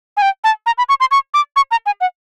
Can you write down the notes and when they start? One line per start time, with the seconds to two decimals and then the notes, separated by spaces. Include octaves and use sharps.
0.17 G#5
0.22 G5
0.44 A5
0.66 A#5
0.78 B5
0.89 C#6
1.00 C6
1.11 C#6
1.34 D6
1.56 C#6
1.71 A#5
1.86 G#5
2.01 F#5